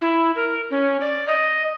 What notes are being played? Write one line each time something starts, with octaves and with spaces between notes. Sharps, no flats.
E4
A#4
C#4
D5
D#5